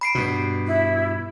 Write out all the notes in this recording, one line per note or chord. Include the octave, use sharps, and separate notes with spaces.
B5 C7 D7
G2 B2
E4